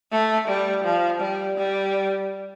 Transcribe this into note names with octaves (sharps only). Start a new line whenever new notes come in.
A3
G3
F3
G3
G3